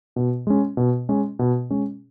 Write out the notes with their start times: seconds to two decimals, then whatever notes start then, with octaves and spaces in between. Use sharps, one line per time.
0.16 B2
0.47 G#3 C#4
0.77 B2
1.09 G#3 C#4
1.39 B2
1.70 G#3 C#4